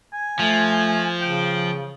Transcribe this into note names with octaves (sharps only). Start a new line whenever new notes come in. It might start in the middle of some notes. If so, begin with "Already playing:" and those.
G#5
F3 A3
C#3 G5